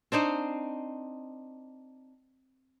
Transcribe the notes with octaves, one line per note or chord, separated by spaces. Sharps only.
C4 D4 D#4 C5